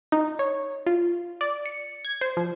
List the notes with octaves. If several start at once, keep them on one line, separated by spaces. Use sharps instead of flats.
D#4
C#5
F4
D5
C#7
G#6
C5
F3